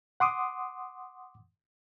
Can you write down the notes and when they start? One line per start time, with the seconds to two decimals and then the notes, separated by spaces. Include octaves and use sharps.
0.20 F#5 C6 D6 D#6